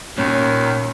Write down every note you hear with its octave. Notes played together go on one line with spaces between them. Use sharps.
D#2 A#2 C#4